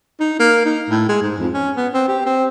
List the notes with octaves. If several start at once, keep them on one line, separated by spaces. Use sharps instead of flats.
D#4
A#3
D#4
A2
G#3
G#2
F2
C#4
B3
C4
G4
C4